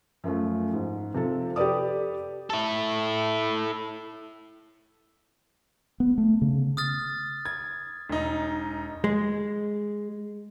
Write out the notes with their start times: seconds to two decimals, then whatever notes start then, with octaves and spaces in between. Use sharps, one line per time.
0.24 F#2 F3 A3
0.73 G#2
1.14 C3 F3 A4
1.56 G4 A4 B4 D5 D#6
2.50 E4 A4
6.00 B3
6.18 A3
6.42 C#3
6.77 D#6 F6 A6
7.46 G#6
8.09 E1 D#4
9.04 G#3